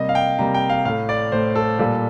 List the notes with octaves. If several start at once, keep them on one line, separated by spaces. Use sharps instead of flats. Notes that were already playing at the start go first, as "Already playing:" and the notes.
Already playing: C3 G3 A#3 D#5
F5
G5
C3 G3 A#3 A#5
G5
F5
A2 A3 F5
D5
A2 A3 C5
A4
A#2 G3 A#3 A4